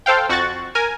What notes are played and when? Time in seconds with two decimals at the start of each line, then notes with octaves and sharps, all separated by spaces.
0.06 A4 C5 F5 G5
0.29 F2 F#4 C#6 F#6 A6
0.75 A#4 G#5